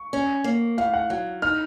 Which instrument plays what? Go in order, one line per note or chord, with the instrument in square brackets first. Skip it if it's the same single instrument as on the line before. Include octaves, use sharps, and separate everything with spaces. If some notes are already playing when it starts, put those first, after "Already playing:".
Already playing: [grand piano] C#6
[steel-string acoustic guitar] C#4
A#3
[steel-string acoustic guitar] A2 [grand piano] F5
[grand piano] F#5
[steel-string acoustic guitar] F#3 [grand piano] F#5
[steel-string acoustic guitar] D#4 [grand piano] F6